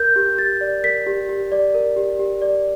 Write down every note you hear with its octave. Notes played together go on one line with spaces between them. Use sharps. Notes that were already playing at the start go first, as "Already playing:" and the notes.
Already playing: A#4 G6
G4
G4 A6
D5
A#4 B6
G4
G4
D5
A#4
G4
G4
D5